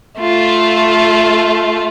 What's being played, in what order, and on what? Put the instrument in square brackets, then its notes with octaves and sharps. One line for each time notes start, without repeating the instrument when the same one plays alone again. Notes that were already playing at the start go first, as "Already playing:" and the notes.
[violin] A3 [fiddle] F4